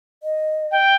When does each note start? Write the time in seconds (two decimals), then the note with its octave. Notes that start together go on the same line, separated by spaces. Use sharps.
0.23 D#5
0.71 G5